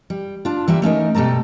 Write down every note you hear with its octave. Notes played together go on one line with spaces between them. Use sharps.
G3
D4 F4
E3 G3 A#3 E5
A3 C#4 D#4 A#4
B2 G3 A3 A4 A#5